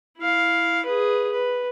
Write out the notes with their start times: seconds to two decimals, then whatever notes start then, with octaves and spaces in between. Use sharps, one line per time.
0.18 E4 F5
0.86 G#4 B4
1.32 B4